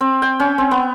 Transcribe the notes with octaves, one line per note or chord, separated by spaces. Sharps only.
C4
G5
C#4
C4
B3